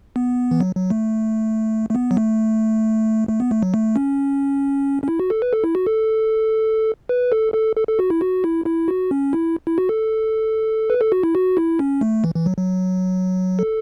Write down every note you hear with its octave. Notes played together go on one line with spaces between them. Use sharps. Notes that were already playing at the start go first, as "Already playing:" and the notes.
B3
E3
F#3
F#3
A3
A3
B3
F#3
A3
A3
B3
A3
F#3
A3
C#4
C#4
E4
F#4
A4
B4
A4
E4
F#4
A4
B4
A4
A4
A4
A4
F#4
E4
F#4
E4
E4
F#4
C#4
E4
E4
F#4
A4
B4
A4
F#4
E4
F#4
E4
C#4
A3
E3
E3
F#3
F#3
A4